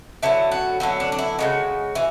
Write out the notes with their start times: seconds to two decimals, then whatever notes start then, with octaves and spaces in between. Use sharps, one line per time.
0.23 D3 F#3 B3 E4
0.51 F#4
0.80 D3 F#3 B3 E4
1.00 D4
1.12 D4
1.19 E4
1.38 C#3 E3 G#3 F#4
1.95 E3